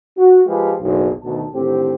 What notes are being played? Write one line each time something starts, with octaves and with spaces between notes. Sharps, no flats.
F#4
F3 G#3 F4 G4 B4 F5
F#1 B1
D2 B2 D#3 A5
A2 D3 D#3 C4 G4